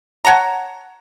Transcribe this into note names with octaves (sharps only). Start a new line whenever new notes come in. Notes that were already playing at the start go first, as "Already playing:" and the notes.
C#5 F#5 A5 A#5